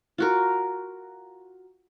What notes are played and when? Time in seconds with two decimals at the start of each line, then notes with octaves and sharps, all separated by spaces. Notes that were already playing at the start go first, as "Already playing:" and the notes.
0.18 F4 F#4 A#4